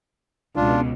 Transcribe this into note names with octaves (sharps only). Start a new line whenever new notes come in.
C#2 B2 D4 F4